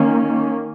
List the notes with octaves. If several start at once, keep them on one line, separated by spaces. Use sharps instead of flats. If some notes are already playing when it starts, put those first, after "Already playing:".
Already playing: D#3 A#3 C#4